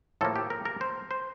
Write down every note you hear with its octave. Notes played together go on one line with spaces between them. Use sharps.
A2 F3 A#3 A4
G4
A#4
A#4
C5
C5